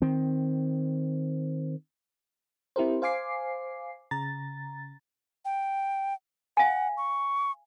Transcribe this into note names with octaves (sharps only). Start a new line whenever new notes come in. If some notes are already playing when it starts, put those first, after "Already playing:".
D#3 C4
C4 E4 G4 A#4 C5
C5 F5 G#5 D6 C7
C#3 A#5 A6
G5
F5 F#5 G#5
C#6